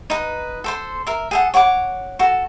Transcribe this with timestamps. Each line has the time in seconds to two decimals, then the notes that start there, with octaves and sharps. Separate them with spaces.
0.10 D#4 B4
0.64 A4 C5 C6
1.07 A#4 E5
1.31 G#4 A4 F#5
1.54 C#5 F#5 G#5 D6
2.19 F#4 A4